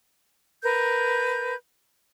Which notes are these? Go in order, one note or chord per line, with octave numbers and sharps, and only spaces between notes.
A#4 B4 G6